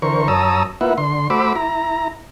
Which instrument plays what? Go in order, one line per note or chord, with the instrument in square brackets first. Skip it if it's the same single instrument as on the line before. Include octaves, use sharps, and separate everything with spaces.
[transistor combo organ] D3 E3 A#4 C5 C#6
F#2 C#5 A5 A#5 D#6 E6
A#3 E4 F4 B4 E5 F#5
D3 C6
A3 F#4 C5 B5 D6 E6
E4 A#5